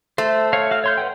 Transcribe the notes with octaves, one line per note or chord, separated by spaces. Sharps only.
A3 C5
C#5 F5
F#4 F5 F6
C#5 C6 G6
B4 F#5 G5